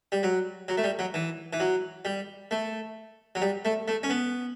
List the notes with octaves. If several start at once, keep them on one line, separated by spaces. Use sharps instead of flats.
G3
F#3
F#3
A3
G3
F#3
E3
E3
F#3
G3
A3
F#3
G3
A3
A3
C#4
B3